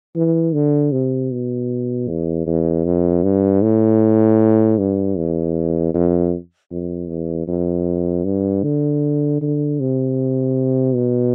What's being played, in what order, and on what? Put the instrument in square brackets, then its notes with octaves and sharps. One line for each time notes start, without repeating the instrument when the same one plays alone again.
[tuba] E3
D3
C3
B2
E2
E2
F2
G2
A2
G2
E2
F2
F2
E2
F2
G2
D3
D3
C3
B2